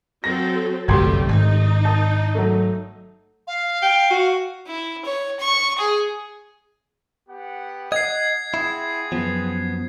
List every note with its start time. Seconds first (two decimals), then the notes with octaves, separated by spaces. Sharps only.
0.24 F#3 C4 A4 A#6
0.88 G1 C2 F#2 G3 A3 G4 C6 G#6
1.29 G#1 D#4
1.85 A5 D#6
2.35 F#3 A3
3.47 F5
3.83 G5
4.10 F#4
4.68 E4
5.05 C#5
5.40 C#6
5.78 G#4
7.29 B3 G4 F#5
7.92 D#5 F#5 G#6 C7
8.54 C4 E4 G#4 F#5
9.12 F#2 F3 B3